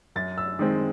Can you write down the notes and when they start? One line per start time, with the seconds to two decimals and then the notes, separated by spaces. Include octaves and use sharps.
0.16 F#2 A6
0.38 E6
0.59 D#3 G#3 C4